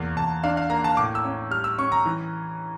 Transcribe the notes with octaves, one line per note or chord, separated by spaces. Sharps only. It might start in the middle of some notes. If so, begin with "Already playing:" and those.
Already playing: E2 A#3
E2 A5
D4 F5
F5
A#3 A#5
A5
A2 D6
E6
C#4
G3 F6
E6
C#4 C#6
A#5
E3